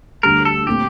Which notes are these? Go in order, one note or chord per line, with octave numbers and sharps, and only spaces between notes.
D2 D3 G3 A#4
A4
A#2 A3 C4 G4